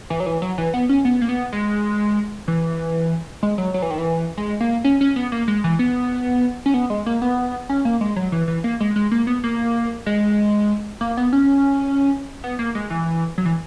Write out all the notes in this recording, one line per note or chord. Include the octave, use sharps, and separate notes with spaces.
E3
F#3
E3
F#3
E3
B3
C#4
B3
A#3
B3
G#3
E3
G#3
F#3
F#3
E3
D#3
E3
G#3
A#3
C#4
C#4
B3
A#3
G#3
E3
B3
C#4
B3
G#3
A#3
B3
C#4
A#3
G#3
F#3
E3
E3
A#3
G#3
G#3
A#3
B3
A#3
G#3
A#3
B3
C#4
B3
A#3
G#3
E3
F#3
E3